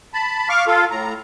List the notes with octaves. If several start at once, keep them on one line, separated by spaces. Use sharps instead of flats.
A5 B5
F5 C#6 D6 F6
F4 A4 F5
A2 A#5